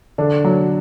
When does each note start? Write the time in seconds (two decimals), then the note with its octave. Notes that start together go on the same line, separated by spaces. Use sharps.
0.18 D3 D4
0.44 F#3